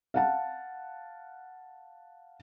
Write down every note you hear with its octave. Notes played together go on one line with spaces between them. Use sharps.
F5 F#5 A5